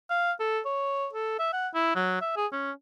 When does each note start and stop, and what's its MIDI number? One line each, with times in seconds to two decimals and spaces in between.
0.10 0.32 77
0.40 0.60 69
0.65 1.08 73
1.13 1.37 69
1.39 1.48 76
1.53 1.68 78
1.75 1.93 64
1.95 2.18 54
2.22 2.34 76
2.37 2.47 68
2.52 2.72 61